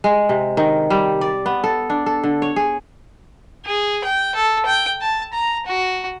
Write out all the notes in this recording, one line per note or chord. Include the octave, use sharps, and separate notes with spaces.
G#3
C3
D#3
G3
D5
B3
A4
D4
A4
D3
C#5
G#4
G#4
G5
A4
G5
A5
A#5
F#4